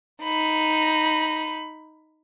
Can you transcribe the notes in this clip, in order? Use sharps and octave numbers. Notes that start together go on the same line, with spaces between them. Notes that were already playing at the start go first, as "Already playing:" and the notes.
D#4 B5